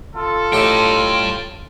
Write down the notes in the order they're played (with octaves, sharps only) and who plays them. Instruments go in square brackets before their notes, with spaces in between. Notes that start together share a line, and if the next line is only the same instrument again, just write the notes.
[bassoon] F4 [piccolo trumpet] A4
[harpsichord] A2 D#4 G4 [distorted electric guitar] G5 A5